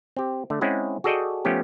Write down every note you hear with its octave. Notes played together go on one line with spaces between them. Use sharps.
C4 G4
D3 A3
G#3 C4 C#4 E4 G#4 F#5
F#4 G#4 A4 D5 D#5 G5
F3 A3 B3 C#4 G4